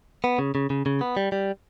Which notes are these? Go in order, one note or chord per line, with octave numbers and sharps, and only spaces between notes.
B3
C#3
C#3
C#3
C#3
B3
G3
G3